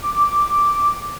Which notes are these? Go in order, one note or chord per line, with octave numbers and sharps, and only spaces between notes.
D6